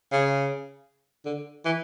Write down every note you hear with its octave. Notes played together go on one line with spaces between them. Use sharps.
C#3
D3
E3